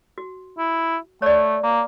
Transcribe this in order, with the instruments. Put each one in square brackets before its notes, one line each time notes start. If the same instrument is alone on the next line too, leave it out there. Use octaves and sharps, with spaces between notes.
[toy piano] F#4
[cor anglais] E4
[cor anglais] A3 [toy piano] C#5 D5
[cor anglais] A#3